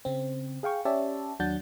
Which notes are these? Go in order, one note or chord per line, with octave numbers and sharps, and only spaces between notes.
C#3 C4
G#4 F5 G5 C#6
C#4 G4 C#5 D5 E5 A5
D#2 F#3 D4 F#5 G6 A6